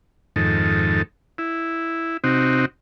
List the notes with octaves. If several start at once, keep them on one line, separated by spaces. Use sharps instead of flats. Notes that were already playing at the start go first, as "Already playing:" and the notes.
F2 G#2 D#3 A4
E4
C3 C4 D#4 F#4